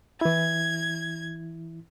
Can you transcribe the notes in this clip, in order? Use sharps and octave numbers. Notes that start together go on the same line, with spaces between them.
E3 E4 G#6